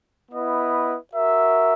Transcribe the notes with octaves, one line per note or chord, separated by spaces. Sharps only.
B3 E4 B4 D#5
F#4 A#4 E5